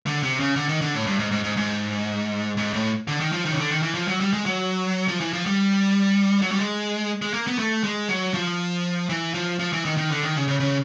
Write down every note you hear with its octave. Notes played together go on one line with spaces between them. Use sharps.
D3
C3
C#3
D3
D#3
D3
A2
G2
G#2
G#2
G#2
G#2
G#2
A2
D3
D#3
F3
D#3
C#3
D3
D#3
E3
F3
F#3
G3
G#3
F#3
F3
E3
F3
G3
F#3
G3
G#3
G#3
A#3
B3
A3
G#3
F#3
F3
E3
F3
F3
E3
D#3
D#3
D3
D#3
C#3
C#3
C#3